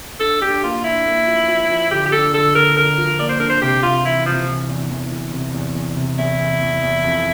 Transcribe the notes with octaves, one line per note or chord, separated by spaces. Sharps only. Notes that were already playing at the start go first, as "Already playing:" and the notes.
D4 A4
D4 G4
A#3 F4
D4 E4
A#3
F3
F3
F3
D3 G4
G4
D4 A4
D3 A4
D3 A#4
D3 A#4
F3
A#3 D5
C5
D4 A#4
C5
C3 G4
C3 F4
E3 E4
C3 F3
E3
E2
E2
E3
C3
E2
E2
C3
E2 E4
E2
E2
E2
F2